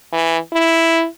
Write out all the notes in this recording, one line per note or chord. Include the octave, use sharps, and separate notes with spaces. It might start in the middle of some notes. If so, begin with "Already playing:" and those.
E3
E4